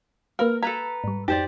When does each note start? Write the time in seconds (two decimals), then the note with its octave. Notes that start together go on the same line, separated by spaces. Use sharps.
0.39 A#3 A#4 B4 F5
0.63 A4 B4 F5 A#5 G#6 B6
1.04 G#2 G3
1.28 F2 D#4 G4 C5 D5